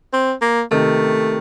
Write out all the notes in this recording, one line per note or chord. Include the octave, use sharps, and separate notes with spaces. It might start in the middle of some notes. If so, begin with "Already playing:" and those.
C4
A#3
C3 D#3 A3